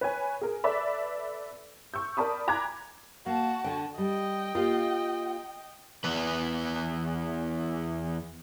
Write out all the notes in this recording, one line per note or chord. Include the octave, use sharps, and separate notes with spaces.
B4 C#5 G#5
G#4 A#4
A4 B4 D5 E5 B5
C#6 E6 G6
A#4 D5 A5 B5 D#6
G#5 A#5 B5 D6 F#6 G#6
A#3 F#4 A5
D3 G5
G3 D#5 G5
A#3 F4 G4
E2 E3 B3 B4